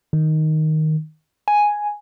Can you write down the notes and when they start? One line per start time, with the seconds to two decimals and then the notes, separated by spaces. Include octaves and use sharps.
0.13 D#3
1.48 G#5